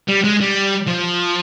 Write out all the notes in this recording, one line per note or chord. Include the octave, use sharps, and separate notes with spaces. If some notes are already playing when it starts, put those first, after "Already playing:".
G3
G#3
G3
F3